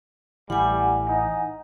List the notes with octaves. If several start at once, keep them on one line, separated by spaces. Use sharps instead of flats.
A1 E3 G3 F#5 G#5
D#4